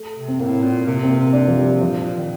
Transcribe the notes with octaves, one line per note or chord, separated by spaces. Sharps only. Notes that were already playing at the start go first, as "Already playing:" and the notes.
Already playing: A3
C3
C4
A2 A#3
A#2 C4
C3 A#3
C4
A#3
D4
F3
G3
A#2 F3
A#2
D#3